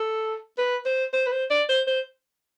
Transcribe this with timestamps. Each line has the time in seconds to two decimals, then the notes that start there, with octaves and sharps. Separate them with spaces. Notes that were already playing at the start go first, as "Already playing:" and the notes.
Already playing: A4
0.58 B4
0.86 C5
1.13 C5
1.26 B4
1.32 C5
1.50 D5
1.69 C5
1.87 C5